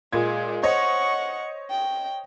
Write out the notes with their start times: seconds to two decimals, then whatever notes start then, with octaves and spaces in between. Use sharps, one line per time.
0.13 A#2 G#3 G#6
0.63 C5 C#5 D#5 F#5 C#6
1.70 G5